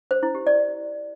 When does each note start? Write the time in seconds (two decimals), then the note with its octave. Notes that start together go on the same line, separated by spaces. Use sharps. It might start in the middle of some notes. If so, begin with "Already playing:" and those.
0.11 C5
0.23 E4
0.35 G4
0.47 D5